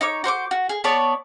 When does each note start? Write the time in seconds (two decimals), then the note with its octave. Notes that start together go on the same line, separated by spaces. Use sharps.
0.01 D#4 C#5 D6
0.24 F#4 C5 C#6 D6
0.51 F#4
0.69 G#4
0.84 B3 C#5 D5 A5